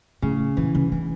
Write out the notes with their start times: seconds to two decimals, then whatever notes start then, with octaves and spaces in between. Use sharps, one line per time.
0.22 A2 C#3
0.57 A#2 E3
0.75 C#3
0.92 D3 E3